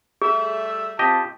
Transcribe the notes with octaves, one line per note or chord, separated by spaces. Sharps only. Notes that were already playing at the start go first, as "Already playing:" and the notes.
G3 A3 G#4 E5
C4 F4 G4 D#5 A5